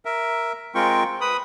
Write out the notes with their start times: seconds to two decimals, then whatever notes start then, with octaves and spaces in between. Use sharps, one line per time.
0.05 A#4 E5
0.75 G#3 C4 F4 A#4 G5 C#6
1.21 B4 B5 D#6